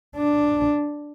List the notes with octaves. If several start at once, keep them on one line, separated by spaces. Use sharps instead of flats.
D4